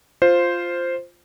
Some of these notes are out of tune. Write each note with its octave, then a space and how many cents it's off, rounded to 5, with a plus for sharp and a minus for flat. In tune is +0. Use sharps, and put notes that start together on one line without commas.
F4 +0 C5 +0